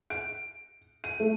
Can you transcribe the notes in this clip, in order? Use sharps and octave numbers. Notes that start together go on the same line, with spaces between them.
D7
D#7
A3